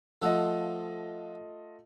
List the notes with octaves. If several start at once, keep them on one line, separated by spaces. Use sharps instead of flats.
F3 A3 F4 A4 D#5 F#5